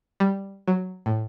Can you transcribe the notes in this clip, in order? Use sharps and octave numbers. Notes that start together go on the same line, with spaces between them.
G3
F#3
A2